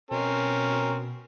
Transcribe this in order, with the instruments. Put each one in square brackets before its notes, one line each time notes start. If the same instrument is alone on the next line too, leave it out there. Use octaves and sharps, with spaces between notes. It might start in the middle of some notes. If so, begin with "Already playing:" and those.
[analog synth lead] B2 [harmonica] C4 C#4 A#4